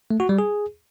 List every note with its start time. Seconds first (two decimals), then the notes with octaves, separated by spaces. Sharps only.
0.10 A3
0.20 F#4
0.29 G3
0.39 G#4